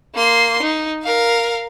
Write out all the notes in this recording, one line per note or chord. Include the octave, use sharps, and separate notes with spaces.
A#3 C6
D#4
A#4 F5